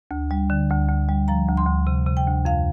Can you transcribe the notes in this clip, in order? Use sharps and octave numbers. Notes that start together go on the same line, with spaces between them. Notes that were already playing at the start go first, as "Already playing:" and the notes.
D2
G3
D3
D2
D2
G3
F3 A#5
D2
C6
D2
C3
C3
G5
D2
F2 F5